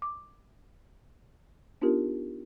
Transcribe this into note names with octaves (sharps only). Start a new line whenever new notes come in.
D6
B3 D4 D#4 F4 G4 A#4